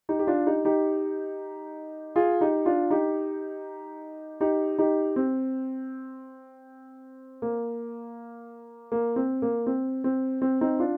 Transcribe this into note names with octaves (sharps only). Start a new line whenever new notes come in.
D#4 G4
G4
D4 F4
D#4 G4
D#4 G4
F4 G#4
D#4 G4
D4 F4
D#4 G4
D#4 G4
D#4 G4
C4
A#3
A#3
C4
A#3
C4
C4
C4
C4 D#4
D4 F4